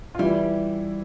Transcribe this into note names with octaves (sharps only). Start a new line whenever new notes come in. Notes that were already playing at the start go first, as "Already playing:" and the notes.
F4
E3 G3 E4